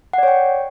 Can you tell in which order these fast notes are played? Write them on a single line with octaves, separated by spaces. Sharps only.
F#5 D5 C#5 G5